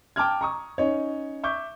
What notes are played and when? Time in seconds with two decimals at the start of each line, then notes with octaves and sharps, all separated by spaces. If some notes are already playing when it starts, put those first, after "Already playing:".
0.16 G5 A5 D6 F6 G#6
0.41 A#5 C#6 D#6
0.78 C#4 D#4 C#5
1.43 E5 C#6 D6 G6